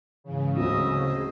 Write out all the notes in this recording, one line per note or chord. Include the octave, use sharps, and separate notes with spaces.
G#2 C#3 E3
D1 F#3 C#4 D#5 E5
G#4 C5